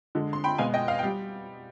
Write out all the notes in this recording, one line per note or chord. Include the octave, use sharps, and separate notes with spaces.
D3 G#3
C6
G5 B5
B2 G#3 F5 G#5
D#5 G5
F5
G3 G5